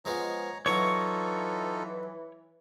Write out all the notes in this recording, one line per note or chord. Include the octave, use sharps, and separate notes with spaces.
F3 G#3 B3 C#5 A#5
E3 F#3 D#4 F4 A4 C#5 A#5 C#6